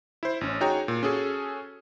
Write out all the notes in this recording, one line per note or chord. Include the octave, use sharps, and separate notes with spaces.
E4 C5
A1 C#4
D#4 F#4 G#4 C#5 G5 A#5
A#2
C#4 F#4 G#4 A4